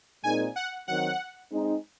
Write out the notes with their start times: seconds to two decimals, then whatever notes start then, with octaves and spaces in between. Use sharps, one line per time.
0.22 A#2 G#3 C4 D#4 A#4 G#5
0.56 F#5
0.87 D#3 F#3 C4 F#5
1.52 G#3 C4 D#4